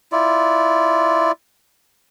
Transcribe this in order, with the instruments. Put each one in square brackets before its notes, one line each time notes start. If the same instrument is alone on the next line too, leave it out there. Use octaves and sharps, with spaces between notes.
[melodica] E4 F4 D5